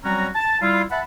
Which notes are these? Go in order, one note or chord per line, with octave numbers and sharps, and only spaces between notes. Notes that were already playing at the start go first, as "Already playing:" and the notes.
F#3 G3 C4 C#4 F#4 A#5
A5
G3 E4 F4
E5 F#5 A5 B5